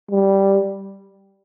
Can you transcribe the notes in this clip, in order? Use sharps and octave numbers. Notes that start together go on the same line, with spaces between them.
G3